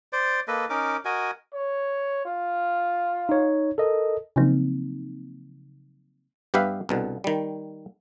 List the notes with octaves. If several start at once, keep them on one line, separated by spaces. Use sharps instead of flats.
C5 D5
A#3 A4 B4 D#5
C#4 D#4 A#4 D6
F#4 A#4 D#5 G#5
C#5
F4
D#4 C#5
A4 A#4 D#5
C#3 F3 F#3 A#3 C4 D#4
G2 B3 G4 B4 E5 F5
C2 B2 D3
D#3 G3